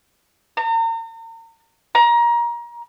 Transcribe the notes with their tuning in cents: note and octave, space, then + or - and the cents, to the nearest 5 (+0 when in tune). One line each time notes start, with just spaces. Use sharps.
A#5 -40
A#5 +25